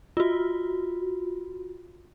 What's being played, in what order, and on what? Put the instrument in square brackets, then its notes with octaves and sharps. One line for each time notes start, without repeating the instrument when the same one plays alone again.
[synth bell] F4 F#4